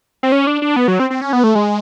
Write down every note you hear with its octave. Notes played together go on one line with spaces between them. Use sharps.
C4
C#4
D4
D4
B3
F#3
C4
C4
C#4
B3
A3
G#3